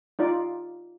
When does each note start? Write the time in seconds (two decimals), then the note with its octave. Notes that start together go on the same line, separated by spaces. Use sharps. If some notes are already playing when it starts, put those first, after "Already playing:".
0.19 D#4 F4 D5